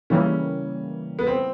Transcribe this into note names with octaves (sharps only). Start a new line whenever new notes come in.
C#3 E3 G3 A#3 C#4
B3
C4